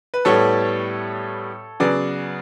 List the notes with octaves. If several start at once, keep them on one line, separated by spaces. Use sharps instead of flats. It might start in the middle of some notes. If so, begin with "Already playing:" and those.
B4
A2 G3 B3 A4 C#5
C#3 F#3 B3 B4 D5